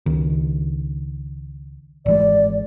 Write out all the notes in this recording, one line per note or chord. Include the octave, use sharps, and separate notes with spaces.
C#2 D#3
G#1 E3 G#3 D5